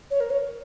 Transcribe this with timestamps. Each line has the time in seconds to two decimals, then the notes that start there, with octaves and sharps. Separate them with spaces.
0.11 C#5
0.20 A#4
0.30 C#5